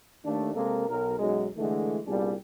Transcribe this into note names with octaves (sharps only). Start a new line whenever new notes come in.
D#2 A3 D4
C3 G#3 A#3 A4 A#4
B1 A#4
B1 F#2 G#3
D3 E3 G#3 A3
C2 A#2 G3 B3 D4 G#4